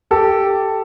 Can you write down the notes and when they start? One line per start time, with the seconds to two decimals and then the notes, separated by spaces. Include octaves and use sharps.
0.11 G4 A4